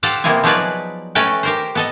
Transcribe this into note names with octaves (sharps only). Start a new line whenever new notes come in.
G4 A4 C5 F5 F#5 A5
C3 A#3 B3 E4 F4 G#5
F3 F#3 D#4 G#4 B4 D5
A3 C#4 A4 B4 G5 A#5
G4 A#4 C5
B3 A4 D#5